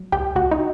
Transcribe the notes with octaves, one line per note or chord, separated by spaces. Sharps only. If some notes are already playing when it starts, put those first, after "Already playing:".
Already playing: F#3
C#2 G4 G5
C#2 F#4 F#5
D#4 D#5